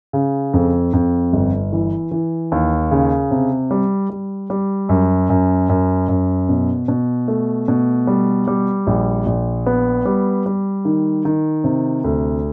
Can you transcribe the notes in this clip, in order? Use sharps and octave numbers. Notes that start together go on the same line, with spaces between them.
C#3
F2
F2
G1
E3
E3
D#2
C#3
C3
G3
G3
G3
F#2
F#2
F#2
F#2
B2
B2
A3
B2
G3
G3
A#1
A#1
B3
G3
G3
D#3
D#3
C3
D2